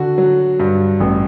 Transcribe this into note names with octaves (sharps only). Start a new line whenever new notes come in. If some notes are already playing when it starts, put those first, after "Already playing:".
Already playing: D3 F#4
F#3
G2
A1